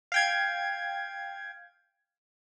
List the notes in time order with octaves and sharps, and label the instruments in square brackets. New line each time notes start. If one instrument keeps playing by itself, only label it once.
[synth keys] F5 G5 G#6